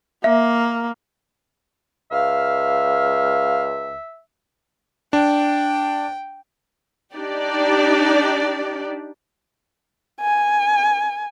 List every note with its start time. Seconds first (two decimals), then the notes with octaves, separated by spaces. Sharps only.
0.24 A#3 E5
2.11 C#2 E5 F5
5.13 D4 G5
7.15 D4 D#4 G4 D5
10.20 G#5